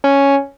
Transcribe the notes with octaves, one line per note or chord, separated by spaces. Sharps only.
C#4